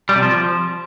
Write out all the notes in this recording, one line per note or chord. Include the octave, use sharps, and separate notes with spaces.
G3
C3
F3